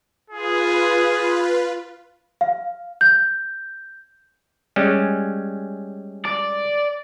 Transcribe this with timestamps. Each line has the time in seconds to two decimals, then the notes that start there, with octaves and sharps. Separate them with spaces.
0.30 F4 G#4 B4
2.41 F5
3.01 G6
4.76 G3 G#3 C#4
6.25 D5